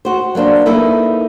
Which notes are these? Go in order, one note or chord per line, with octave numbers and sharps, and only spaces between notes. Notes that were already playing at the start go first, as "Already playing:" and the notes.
F#4 C5
F#3 A#3 D4 C5
A#3 D#4 E4 A4 B4